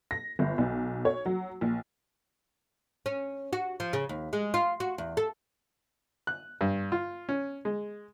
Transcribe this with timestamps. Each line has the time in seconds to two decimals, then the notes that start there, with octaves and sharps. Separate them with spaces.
0.11 A#6
0.39 G1
0.58 B1
1.05 C#5
1.26 F#3
1.61 A#1
3.06 C#4
3.53 F#4
3.80 F3
3.93 C#3
4.09 D#2
4.33 G#3
4.54 F4
4.80 F#4
4.98 E2
5.17 A4
6.27 F#6
6.61 G2
6.92 F4
7.29 C#4
7.65 G#3